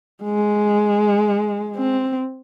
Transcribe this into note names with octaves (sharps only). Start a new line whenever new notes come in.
G#3
C4